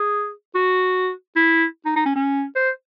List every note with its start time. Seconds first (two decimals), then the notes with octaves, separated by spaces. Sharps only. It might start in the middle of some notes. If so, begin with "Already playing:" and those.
Already playing: G#4
0.55 F#4
1.36 E4
1.86 D#4
1.96 D#4
2.06 C#4
2.16 C#4
2.56 C5